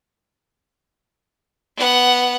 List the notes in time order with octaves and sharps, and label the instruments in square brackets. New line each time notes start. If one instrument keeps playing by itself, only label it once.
[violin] B3 F#5